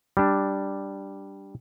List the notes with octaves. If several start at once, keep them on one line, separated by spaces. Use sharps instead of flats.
G3 D4